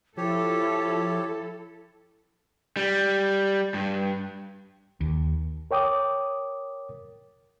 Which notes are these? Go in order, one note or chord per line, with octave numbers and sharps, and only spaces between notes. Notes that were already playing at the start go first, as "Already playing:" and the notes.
F3 E4 G4 A4 C#5
G3
G2
D#2
A#4 C#5 G5 D6 D#6